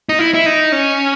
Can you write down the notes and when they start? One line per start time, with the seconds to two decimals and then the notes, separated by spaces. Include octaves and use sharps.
0.09 D#4
0.19 E4
0.34 E4
0.46 D#4
0.72 C#4